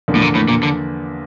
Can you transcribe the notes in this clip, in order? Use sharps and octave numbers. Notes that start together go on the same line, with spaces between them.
E2 D3 F3 A#3 D4
A2
A#2
A2
A#2
D3